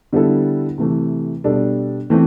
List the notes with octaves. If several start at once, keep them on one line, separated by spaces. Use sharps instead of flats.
D3 G3 B3 E4 A4
C3 E3 A3
B2 G3 D4 A4
E3 A3 C4